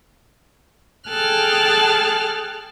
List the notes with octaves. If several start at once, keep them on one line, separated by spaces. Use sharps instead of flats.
G#4 A4 G5 A5 F6 F#6